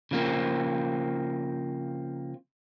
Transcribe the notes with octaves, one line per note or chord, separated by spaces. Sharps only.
C#3 F3 A#3 C4